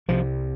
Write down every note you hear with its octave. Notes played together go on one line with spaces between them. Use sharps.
C2 C3 F3